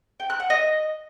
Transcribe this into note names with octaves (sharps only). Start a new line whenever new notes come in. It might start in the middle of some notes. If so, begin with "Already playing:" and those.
G5
F#6
F#5
D#5